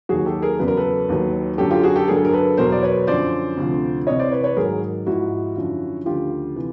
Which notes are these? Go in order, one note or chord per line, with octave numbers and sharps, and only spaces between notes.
D#2 D#3 F#3 F#4 G#4
G4 A4
G#4 A#4
E2 C#3 F#3 B4
A#4
A4 B4
D#2 D#3 F#3
F#2 D3 F#3 G4 A4
F4 G4
F#4 G#4
G4 A4
G2 D3 F#3 G#4 A#4
A4
A#4
A4 B4
E2 B2 F#3 A#4 C5
D5
B4 C#5
F#2 D3 F3 C5 D5
D2 C3 F3
C2 C3 E3 C#5 D#5
C5 D5
B4 C#5
B4 C#5
G#2 D#3 F#3 G#4 A#4
G#2 F3 E4 F#4
F#2 D3 F3
D2 C#3 F3 F4 G4
C3 E3